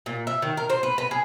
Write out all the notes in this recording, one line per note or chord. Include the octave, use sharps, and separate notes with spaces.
A#2
E5
D#3
A#4
C5
B4
B4
G#4